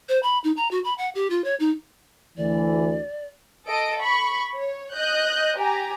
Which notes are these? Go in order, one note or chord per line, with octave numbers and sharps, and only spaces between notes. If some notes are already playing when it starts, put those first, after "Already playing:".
C5
B5
D#4
A#5
F#4
B5
F#5
G4
F4
C#5
D#4
D2 E3 D5
A4 D#5 D7
B5 C#6
C#5
D#5 F#6 G6
G4 G#5 A#5